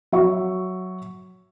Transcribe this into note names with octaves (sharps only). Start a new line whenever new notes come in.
F#3 E5 C#6